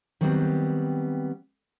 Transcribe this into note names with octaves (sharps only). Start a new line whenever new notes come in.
D#3 F#3 G3 B3 C4